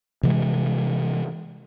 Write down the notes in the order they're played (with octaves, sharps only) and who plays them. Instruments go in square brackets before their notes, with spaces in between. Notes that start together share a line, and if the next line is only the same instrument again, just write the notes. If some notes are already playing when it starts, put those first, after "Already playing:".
[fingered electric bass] C3 E3 G#3